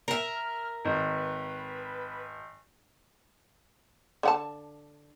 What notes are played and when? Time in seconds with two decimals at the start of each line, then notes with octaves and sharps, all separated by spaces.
0.08 A#4 E5 F6
0.85 G#1 B4
4.23 D3 F#5 A5